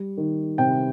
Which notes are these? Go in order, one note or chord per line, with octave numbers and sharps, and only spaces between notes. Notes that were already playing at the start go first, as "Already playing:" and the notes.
Already playing: G3
D#3
C3 G5